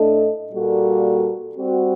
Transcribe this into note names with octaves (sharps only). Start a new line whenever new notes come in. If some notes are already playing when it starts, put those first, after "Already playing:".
Already playing: A2 A3 D4 A4 D#5
A#2 G3 A#3 F#4 A4
G3 C4 F#4